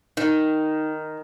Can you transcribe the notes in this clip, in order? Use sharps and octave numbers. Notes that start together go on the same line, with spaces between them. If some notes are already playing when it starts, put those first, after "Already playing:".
D#3 D#4